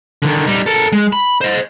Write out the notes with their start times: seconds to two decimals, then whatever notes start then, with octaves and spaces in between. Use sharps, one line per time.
0.22 D3 D#3
0.47 G3 D#4
0.66 A4 A#4
0.92 G#3
1.13 B5
1.41 C5 D#5